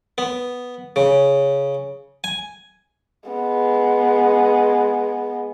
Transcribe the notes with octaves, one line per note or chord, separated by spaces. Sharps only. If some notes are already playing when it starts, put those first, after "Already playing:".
B3
C#3
G#5
G#3 B3